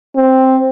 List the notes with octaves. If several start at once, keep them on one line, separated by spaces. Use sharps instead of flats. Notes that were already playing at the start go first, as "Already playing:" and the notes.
C4